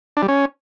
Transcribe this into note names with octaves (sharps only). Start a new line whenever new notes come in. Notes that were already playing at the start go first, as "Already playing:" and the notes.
D4
G3
C#4